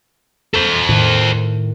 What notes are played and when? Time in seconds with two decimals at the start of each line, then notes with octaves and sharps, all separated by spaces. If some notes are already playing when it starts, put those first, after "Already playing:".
0.54 A4 C5
0.89 A2 D#3